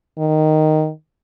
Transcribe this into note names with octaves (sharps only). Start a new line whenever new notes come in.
D#3